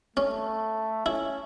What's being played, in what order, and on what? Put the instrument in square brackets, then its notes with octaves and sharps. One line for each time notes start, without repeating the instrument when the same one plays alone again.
[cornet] A3 [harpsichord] C#4
[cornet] C#4 [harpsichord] E4